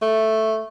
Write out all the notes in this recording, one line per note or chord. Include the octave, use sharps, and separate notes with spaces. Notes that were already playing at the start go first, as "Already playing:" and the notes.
A3